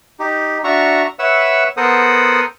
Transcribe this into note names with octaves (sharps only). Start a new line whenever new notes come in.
D#4 G4
D4 F#4 E5 A#5 C#6
B4 C#5 E5 F#5 E6
B3 A4 A#4 C5 F#5 D#6